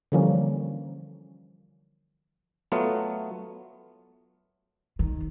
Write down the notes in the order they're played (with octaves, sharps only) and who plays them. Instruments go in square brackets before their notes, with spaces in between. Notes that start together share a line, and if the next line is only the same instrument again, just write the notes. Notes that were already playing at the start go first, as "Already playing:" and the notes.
[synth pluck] D3 E3 F3 G3 A#3 C#4
[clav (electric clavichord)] F#3 A3 B3 F4
[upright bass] D#3